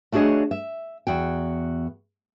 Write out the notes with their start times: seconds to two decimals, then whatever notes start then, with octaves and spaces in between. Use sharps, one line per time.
0.12 A3 D4 F#4 G#4 C#5 D#5
0.51 E5
1.07 E2 F#4 G5